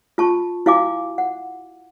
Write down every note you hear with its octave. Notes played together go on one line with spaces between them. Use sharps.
F4 A5 C#6
E4 F#4 F5 G#5 D6
F#5